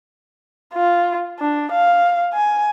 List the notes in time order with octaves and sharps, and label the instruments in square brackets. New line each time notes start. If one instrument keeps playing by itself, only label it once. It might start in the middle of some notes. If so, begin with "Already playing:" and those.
[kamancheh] F4
D4
F5
G#5